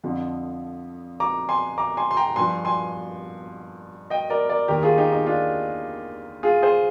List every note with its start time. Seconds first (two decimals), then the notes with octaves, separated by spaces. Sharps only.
0.04 F2 D3 F3
1.20 A#5 D6
1.49 G#5 C6
1.78 A#5 D6
1.97 G#5 C6
2.11 C6
2.17 G5 A#5
2.36 G2 F3 G#5 C6
2.65 G#5 C6
4.10 D#5 G5
4.30 A#4 D5
4.49 A#4 D5
4.68 D#2 D#3 G4 A#4
4.83 F4 G#4
4.98 D#4 G4
5.12 D#4
5.26 D4 F4
6.43 F4 G#4
6.62 G#4 C5